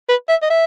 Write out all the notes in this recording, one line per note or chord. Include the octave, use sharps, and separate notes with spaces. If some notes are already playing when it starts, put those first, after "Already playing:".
B4
E5
D#5
E5